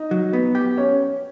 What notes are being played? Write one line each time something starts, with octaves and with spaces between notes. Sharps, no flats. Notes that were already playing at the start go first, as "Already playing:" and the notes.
Already playing: D#4
F#3
B3
G4
C#4